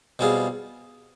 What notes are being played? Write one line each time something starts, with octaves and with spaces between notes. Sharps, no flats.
B2 G3 C4 F4 G#4